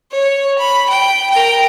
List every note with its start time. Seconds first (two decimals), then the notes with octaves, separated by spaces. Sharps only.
0.11 C#5
0.58 B5
0.89 G5
1.30 A#4 G5